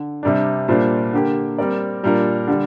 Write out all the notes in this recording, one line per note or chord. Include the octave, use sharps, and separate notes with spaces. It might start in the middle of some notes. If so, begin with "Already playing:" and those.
Already playing: D3
C3 G3 D4
A#2 G3 D4 F4 C5
D3 A#3 G4
G3 C4 A#4 D5
A#2 G3 D4 F4 A#4
D3 G3